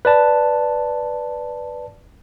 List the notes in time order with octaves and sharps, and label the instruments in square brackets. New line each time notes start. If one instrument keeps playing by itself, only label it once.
[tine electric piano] B4 D5 A5